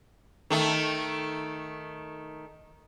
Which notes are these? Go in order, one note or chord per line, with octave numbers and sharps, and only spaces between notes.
D#3 A3